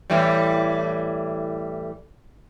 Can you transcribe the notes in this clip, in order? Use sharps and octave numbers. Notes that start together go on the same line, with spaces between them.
A2 E3 G3